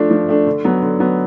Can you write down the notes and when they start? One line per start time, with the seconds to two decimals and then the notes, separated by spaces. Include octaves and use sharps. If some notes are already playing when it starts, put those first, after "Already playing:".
Already playing: F3 A3 D4
0.11 F3
0.28 A3 D4
0.46 D3
0.64 F#3 B3
0.82 D3
1.00 F#3 B3